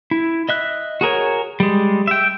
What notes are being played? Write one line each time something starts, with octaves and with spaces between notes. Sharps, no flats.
E4
D#5 E5 F#6
F#4 G#4 A#4 C#5
G3 G#3
E5 G5